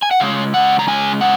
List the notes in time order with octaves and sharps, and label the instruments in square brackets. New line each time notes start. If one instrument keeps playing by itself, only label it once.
[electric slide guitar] G#5
F#5
C#3 G#3 C#4 F5
F#5
A#5
C#3 G#3 C#4 G#5
F#5